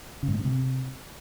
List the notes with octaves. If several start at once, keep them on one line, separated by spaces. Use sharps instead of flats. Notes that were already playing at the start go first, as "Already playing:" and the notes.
C#3
G#2
A#2
C#3
C3